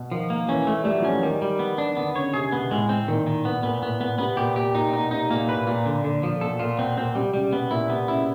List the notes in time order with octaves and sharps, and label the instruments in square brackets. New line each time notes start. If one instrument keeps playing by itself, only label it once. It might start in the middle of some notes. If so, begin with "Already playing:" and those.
Already playing: [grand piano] B2
[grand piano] D#3 [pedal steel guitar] F3
[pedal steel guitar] A#3
[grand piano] E3 [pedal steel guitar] C#4
[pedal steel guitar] A3
[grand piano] G3 [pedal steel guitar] A3
[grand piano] F#3
[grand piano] F3 [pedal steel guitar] C#4
[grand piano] E3
[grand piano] D#3 [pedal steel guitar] G3
[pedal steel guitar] G3
B3
D4
[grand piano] D3 [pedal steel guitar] B3
[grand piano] C#3 [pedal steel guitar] C#5
[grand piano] C3 [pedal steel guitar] G#4
[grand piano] B2 [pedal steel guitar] B3
[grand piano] A2 [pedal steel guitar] G#3
[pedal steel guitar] C4
[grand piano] A#2 [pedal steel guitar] D#3
[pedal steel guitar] D#3
[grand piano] B2 [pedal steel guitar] B3
[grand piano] A#2 [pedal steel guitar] B3
[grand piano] A2 [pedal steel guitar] B3
[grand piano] A#2 [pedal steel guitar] B3
[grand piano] C3 [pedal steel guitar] B3
[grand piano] A#2 [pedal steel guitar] G4
[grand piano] A#2 [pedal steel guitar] G4
[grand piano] A#2 [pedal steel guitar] D#4
[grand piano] B2 [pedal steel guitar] D#4
[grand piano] C3 [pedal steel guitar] D#4
[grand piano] A#2 [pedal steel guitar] A#3
[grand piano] A2 [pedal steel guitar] B4
[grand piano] A#2 [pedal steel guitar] A#3
[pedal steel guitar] D3
D3
F3
[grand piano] B2 [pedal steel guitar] A4
[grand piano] A#2 [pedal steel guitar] F4
[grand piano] B2 [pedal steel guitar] C4
[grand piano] A#2 [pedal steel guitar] C4
[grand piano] C3 [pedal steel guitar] G3
[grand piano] C#3 [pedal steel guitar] G3
[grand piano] B2 [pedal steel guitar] B3
[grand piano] A#2 [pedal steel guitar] E4
[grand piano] C3 [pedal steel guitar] B3
[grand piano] C#3 [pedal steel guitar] E4